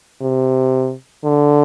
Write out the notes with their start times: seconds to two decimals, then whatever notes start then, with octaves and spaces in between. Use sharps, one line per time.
0.21 C3
1.24 D3